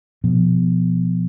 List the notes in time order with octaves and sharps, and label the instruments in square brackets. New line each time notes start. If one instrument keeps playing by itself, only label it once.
[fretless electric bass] B2 F3 B3